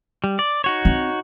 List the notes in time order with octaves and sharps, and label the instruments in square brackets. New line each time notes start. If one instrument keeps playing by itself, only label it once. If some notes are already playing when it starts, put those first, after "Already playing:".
[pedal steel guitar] G3
D5
D#4 F#4 C#5
[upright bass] C4